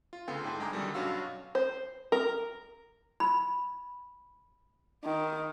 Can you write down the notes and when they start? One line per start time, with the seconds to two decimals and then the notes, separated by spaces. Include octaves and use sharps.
0.13 F4
0.28 D2 C#3 B3 A4 G5 C6
0.44 G#2 E4 G5 A5
0.60 G2 G#3 G5 G#5 A#5 D6
0.73 F#2 B2 D3 D#3 G3
0.94 B1 G2 C#4 F#4 F5 E6
1.55 C5
2.12 A#4
3.20 B5
5.05 D#3